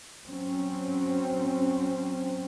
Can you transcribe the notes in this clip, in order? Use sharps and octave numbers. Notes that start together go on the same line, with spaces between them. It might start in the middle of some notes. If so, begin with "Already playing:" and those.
F#3 C4 C#4